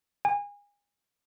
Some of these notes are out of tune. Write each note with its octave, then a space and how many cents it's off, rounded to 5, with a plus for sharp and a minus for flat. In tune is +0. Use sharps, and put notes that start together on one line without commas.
G#5 -30